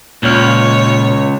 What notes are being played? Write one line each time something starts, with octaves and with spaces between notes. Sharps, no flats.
C#2 A#2 C#5 F6